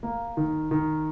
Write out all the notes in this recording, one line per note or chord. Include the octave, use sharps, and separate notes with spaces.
A#3
D#3
D#3